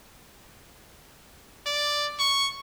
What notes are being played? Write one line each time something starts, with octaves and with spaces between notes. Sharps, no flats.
D5
C#6